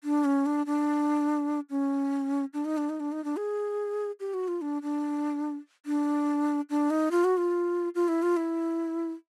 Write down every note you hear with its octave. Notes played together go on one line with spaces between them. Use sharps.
D4
C#4
D4
D4
C#4
D4
D#4
D4
D#4
D4
D#4
D4
G#4
G4
F#4
F4
D4
D4
D4
D4
D#4
F4
F#4
F4
F4
E4
F4
E4